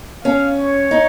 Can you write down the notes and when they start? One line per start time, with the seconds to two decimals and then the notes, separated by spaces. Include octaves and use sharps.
0.24 C#4 F5
0.58 C#5
0.91 D#4